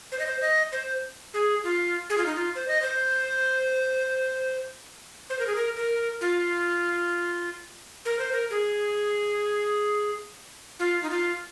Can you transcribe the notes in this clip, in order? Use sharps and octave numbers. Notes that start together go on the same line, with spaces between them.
C5
D#5
C5
D#5
C5
G#4
F4
G#4
F4
D#4
F4
C5
D#5
C5
C5
A#4
G#4
A#4
A#4
F4
A#4
C5
A#4
G#4
F4
D#4
F4